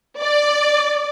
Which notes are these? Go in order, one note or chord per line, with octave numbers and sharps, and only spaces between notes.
D5